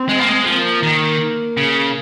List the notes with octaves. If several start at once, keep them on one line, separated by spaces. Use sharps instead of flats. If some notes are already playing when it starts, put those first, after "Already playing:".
Already playing: C4
G#3
A#3
G#3
F3 A#3
D#3
C#3